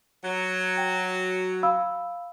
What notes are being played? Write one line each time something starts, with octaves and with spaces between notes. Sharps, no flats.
F#3
G5
F5 B5 E6